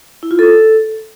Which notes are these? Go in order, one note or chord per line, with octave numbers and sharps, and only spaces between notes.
E4
F4
A4